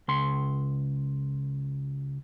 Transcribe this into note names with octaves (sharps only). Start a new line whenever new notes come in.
C#2 C6